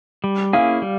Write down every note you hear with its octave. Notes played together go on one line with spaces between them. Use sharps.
G3
A#3 C#4 E4 G#4 F5
G3